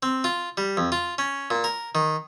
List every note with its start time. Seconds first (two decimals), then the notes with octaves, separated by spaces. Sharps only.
0.03 C4
0.24 F4
0.57 G3
0.77 F2
0.92 F4
1.18 C#4
1.51 A#2
1.64 A#4
1.95 D#3